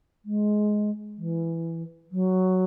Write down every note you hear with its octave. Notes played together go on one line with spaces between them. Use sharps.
G#3
E3
F#3